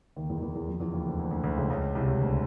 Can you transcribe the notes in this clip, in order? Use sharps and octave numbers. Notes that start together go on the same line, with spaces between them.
D#2 D#3
E2 E3
D#3
E2 E3
E2 E3
F2 F3
E2 E3
D#2 D#3
D2 D3
D2 D3
D2 D3
D2 D3
C#2 C#3
C#2 C#3
C2 C3
C#2 C#3
D2 D3